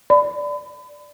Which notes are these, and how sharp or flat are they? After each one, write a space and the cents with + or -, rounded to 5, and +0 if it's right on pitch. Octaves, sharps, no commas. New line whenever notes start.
D5 +0 B5 +35